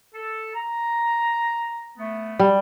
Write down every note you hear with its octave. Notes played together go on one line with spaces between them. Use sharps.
A4
A#5
A3 B3
G3